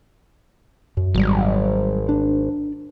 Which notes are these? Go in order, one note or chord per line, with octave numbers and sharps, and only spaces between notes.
F#2
G#1 F#3 G3
D4